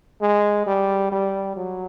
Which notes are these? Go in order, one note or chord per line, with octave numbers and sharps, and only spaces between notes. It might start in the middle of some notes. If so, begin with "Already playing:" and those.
G#3
G3
G3
F#3